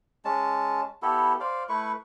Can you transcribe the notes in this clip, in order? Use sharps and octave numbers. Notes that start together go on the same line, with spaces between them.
G#3 C#4 A5
B3 E4 G4 A4
C5 D5 F5
A3 E4 B4 C#6